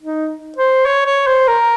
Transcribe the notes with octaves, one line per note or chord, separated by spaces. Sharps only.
D#4
C5
C#5
C#5
C5
A#4